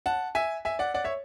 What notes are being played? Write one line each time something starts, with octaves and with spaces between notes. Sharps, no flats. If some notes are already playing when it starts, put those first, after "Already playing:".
F#5 A5
E5 G#5
E5 G#5
D5 F#5
D5 F#5
C#5 E5